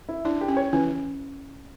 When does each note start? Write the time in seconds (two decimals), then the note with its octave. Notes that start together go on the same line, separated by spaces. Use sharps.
0.09 E4
0.25 D4 E4
0.41 G4
0.48 C#4
0.57 C#5
0.73 E3 C#4